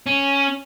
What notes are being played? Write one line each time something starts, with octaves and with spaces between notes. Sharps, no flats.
C#4